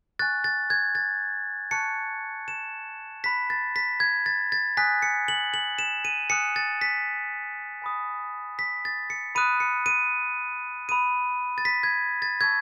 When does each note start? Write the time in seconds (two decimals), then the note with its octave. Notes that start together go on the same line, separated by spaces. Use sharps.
0.19 G#5 C#6 F#6 A6
0.44 A6
0.70 G#6
0.95 A6
1.71 A5 C#6 F#6 C#7
2.48 E7
3.24 B5 F#6 B6
3.50 A6
3.76 B6
4.00 G#6
4.26 A6
4.52 A6
4.77 G#5 D#6 F#6 B6
5.02 C#7
5.28 F#7
5.54 F#7
5.79 E7
6.05 D#7
6.30 G#5 D#6 F#6 C#7
6.56 A6
6.81 B6
7.82 G#5 B5 D#6
8.59 B6
8.85 A6
9.10 C#7
9.35 B5 D#6 F#6 D#7
9.60 C#7
9.86 D#7
10.88 B5 D#6 F#6 D#7
11.58 A6
11.65 B6
11.83 G#6
12.22 A6
12.41 A5 C#6 E6 G#6